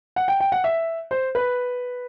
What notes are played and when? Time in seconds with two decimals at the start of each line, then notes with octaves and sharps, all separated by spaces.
0.16 F#5
0.28 G5
0.40 G5
0.52 F#5
0.64 E5
1.11 C5
1.35 B4